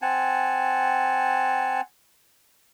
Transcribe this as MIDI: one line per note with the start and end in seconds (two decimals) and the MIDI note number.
0.02 1.81 60
0.02 1.81 78
0.02 1.81 80
0.02 1.81 81